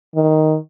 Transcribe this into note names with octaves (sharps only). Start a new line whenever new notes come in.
D#3